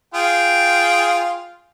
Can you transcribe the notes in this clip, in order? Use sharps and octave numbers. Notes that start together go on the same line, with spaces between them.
F4 G#4 G5